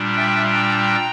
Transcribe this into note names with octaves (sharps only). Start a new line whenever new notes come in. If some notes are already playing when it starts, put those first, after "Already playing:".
Already playing: A#2 G3 D4
E5 G5
G5 A#5